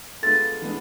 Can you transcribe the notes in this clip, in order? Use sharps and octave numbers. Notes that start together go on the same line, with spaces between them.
G#3 B3 D4 F4 A4 A6
E3 G#3 B3 D4